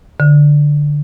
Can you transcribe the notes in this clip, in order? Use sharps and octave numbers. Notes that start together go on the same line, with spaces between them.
D3